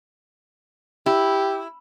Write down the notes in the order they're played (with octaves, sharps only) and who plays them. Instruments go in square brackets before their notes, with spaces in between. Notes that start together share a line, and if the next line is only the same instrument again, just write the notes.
[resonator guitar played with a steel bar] E4 [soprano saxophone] G4